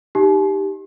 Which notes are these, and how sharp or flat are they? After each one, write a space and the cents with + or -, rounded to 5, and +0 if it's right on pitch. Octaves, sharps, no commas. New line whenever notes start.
D#4 +0 G4 +0